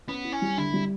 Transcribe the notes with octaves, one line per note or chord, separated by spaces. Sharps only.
B3 C#4
E4
C#4
G3
D3 E4
G3